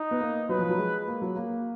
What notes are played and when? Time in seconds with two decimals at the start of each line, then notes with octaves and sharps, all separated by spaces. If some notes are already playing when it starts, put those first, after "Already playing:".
Already playing: D#4
0.11 B3
0.21 A#3
0.49 F#3 B4
0.59 F3
0.69 F#3
0.78 G#3
1.07 A#3
1.22 F#3
1.36 A#3